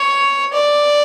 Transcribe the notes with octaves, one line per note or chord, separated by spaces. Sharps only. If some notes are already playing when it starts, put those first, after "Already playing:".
Already playing: C#5
D5